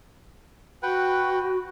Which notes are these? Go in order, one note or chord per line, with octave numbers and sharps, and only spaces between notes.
F#4 B4 F#5 G5